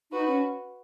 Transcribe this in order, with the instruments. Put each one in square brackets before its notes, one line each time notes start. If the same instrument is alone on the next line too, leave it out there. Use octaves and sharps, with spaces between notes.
[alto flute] D#4 [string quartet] F#4 B4
[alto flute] C#4